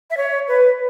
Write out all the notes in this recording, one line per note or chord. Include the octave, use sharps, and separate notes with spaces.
E5
C#5
B4